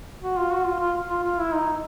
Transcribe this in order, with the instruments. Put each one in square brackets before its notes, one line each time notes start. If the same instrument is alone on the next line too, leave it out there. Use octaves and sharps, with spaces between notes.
[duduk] F#4
F4
F#4
F4
F4
F4
F4
E4
D#4